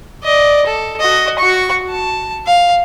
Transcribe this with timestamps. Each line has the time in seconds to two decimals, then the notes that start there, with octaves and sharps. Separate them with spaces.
0.24 D5 D#5
0.66 A4
1.00 F#4 D#5
1.39 F#4 C#6
1.90 A5
2.47 F5